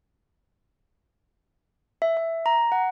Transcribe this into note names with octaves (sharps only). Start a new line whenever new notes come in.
E5
E5
A#5
F#5